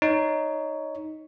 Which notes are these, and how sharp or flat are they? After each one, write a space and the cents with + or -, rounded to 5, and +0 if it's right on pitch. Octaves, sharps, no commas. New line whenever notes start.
D#4 +0 C#5 +15